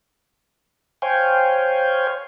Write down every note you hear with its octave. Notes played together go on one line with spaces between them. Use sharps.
C5 C#5 F5 G5 G#5